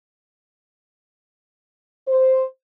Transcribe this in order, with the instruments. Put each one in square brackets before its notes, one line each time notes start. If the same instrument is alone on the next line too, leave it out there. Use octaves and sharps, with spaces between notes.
[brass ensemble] C5